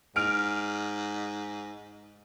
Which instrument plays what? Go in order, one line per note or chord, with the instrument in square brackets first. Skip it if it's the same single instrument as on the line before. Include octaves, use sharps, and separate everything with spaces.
[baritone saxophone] G#2 [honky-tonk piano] F6 D7